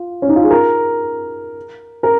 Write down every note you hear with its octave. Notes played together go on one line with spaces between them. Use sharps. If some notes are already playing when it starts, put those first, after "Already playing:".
Already playing: F4
C#4
D#4
F4
G#4
A#4
A#4